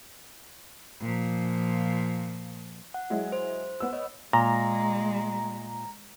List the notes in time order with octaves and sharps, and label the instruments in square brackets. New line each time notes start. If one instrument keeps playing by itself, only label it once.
[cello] A#2 F3
[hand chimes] F#5
[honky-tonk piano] F#3 G#3 E4
[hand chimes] C5
[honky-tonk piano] B3 E6
[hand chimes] C#5 D#5
[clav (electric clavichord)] A#2 [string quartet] G#3 [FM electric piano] A#5